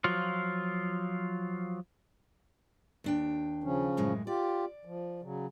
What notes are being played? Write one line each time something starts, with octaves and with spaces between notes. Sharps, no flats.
F3 F#3 F4
D#2 D4 G5
C#3 F3 C#4
F#2 A2 G#3
F4 G4 D5
F3
C#3 F#3